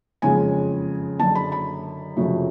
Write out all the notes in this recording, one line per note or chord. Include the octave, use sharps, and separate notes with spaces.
F#1 F2 C#3 G#3 G#5
F#1 F#2 D3 A5
B5
B5
F1 F2 C#3 F#3 A3